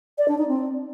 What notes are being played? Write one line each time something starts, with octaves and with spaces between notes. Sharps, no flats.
D5
D4
D#4
C4